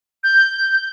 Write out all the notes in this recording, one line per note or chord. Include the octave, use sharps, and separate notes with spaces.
G6